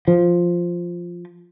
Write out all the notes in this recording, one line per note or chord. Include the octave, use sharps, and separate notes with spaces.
F3